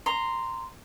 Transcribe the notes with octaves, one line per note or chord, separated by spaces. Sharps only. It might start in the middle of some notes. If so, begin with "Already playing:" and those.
A#5 C6